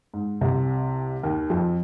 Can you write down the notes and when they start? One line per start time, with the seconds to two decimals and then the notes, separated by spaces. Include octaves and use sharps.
0.14 G#2
0.41 C2 C3
1.23 D#2 D#3
1.50 F2 F3